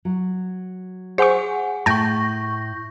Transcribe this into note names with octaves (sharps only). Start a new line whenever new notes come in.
F#3
G#4 C5 F#5 G#5 C#6
A2 G5 A5 C#6 G6 A#6